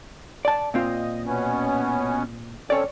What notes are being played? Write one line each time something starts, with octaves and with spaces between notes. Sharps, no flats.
D5 A5
A#2 C4 F4 D#5
B2 B3 C#4
C4 C#4 A4 C#5 D5